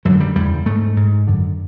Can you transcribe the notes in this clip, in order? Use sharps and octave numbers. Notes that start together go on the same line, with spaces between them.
F#2 D3 F#3
G3
E2 C#3 G3
G#2 A3
G#2
F#2 D3